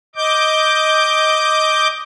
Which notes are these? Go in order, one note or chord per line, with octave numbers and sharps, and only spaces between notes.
D#5 D6 G6